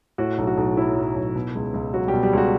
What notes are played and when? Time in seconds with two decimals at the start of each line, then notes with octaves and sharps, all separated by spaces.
0.18 A2 F#4
0.38 B1
0.47 F#4
0.57 B1
0.77 F#3 E4
0.97 A2
1.16 B1
1.36 B2
1.55 C#2
1.74 C#2
1.94 F#3 F#4
2.08 G3 G4
2.14 B2
2.23 G3 G4
2.33 C#2 F#4